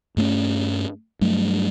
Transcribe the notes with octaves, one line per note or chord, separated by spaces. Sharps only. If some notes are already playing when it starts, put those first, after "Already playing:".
G2 A3 A#3 C#4
G2 F#3 A3